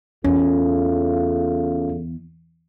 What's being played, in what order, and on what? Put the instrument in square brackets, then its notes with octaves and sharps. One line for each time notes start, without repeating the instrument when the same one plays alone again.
[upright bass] E2 [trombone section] C#3 A3 F4 [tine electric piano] C#4